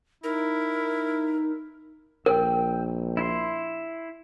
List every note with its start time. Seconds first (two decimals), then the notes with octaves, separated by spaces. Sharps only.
0.24 D#4 E4 A#4
2.26 A#1 A#4 G5 E6
3.17 E4 C6